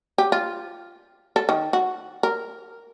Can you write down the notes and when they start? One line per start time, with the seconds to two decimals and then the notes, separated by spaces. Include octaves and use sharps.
0.18 G4
0.32 F4
1.36 A4
1.49 D#3
1.73 F#4
2.23 A#4